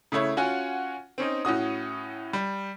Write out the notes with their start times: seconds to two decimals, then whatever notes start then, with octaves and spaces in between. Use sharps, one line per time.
0.12 C#3 A3 E4 C#5
0.37 C#4 F4 F#4 F#5 G#5
1.18 C4 C#4 D#4
1.45 A2 C#4 F#4 D#6
2.33 G3